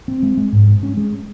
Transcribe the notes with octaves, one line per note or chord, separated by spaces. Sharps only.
C4
G#3
G#3
G#2
G#3
C#4
G#3